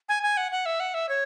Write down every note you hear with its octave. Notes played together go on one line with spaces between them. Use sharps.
G#5
G#5
F#5
F#5
E5
F#5
E5
C#5